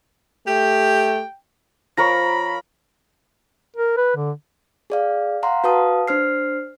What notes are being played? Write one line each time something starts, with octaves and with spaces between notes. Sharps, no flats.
A3 G4 G5
F3 A#4 C#5 B5 A#6
A#4
B4
D3
G#4 D5 F5
F5 F#5 A#5 C6
F#4 B4 F5 A5 D#6
D4 C5 F6 C7